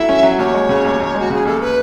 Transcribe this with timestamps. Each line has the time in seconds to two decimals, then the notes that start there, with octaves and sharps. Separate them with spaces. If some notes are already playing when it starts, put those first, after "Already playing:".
Already playing: F#3 E4 A4 E5
0.09 C#4
0.23 F#3
0.39 D#2 C#5
0.54 G#3
0.69 C#3
0.85 D#2
1.00 D#2
1.15 G#3 F#4
1.30 C#3 G#4
1.45 D#2 A4
1.61 B4